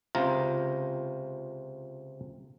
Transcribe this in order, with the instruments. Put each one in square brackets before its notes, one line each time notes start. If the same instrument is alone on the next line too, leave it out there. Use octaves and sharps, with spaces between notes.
[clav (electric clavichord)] C#2 C3 F4 A#5